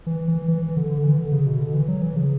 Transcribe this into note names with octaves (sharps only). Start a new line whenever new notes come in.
E3
E3
E3
E3
D3
D3
E3
D3
C#3
B2
D3
E3
F#3
E3
C#3